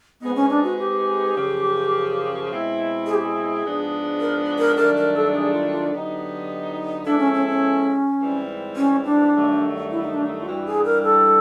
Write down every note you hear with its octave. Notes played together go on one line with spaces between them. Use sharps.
G#3 B3 C4 D#4 G#4 B4
C#4
D4
F#4
G4
F#2 C#3 F3
B2 G#3 C4 E4
G#4
G4
G#4
G#2 F3 G#3 B3 D4
A#4
A#4
G2 D#3 F#3 A3 D4 A#4
A#4
A4
G#4
F4
F4
D3 F#3 B3 D#4 G4
F3 G#3 B3 D4 E4 A4
C#4
C#4
C#4
G#2 E3 G3 C4
C#4
D4
G2 D#3 F#3 A3
E4
D#4
D4
D#4
F4
G2 E3 G3 F#4
G#4
A#4
A4